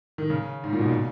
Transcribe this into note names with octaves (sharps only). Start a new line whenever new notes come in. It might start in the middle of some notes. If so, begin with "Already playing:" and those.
D#3
C#3
G#2
A#2
B2
C#3